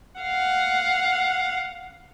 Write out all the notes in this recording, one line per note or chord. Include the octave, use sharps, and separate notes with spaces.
F5 F#5